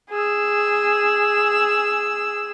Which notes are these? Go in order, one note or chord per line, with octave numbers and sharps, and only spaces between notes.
G#4 E6